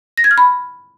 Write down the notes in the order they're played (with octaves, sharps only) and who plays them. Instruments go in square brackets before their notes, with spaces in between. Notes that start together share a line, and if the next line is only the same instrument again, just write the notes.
[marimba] A#6
G#6
F6
B5